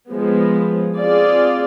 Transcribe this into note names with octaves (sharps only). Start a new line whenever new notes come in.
F3 G#3 B3
C4 F4 G#4 D5